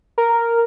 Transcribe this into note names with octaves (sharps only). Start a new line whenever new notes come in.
A#4